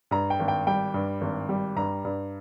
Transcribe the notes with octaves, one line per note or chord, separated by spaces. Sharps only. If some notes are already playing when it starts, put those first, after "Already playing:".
G2 A#5
G5
G#1
G5
G3 G5
G2
G#1
G3
G2 A#5
G2